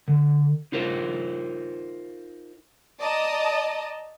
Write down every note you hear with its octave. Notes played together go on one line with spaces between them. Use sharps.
D3
D#4 F4 A#4 C5
D5 D#5 A5 A#5 D#6